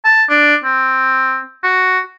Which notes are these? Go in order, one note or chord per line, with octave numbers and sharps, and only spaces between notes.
A5
D4
C4
F#4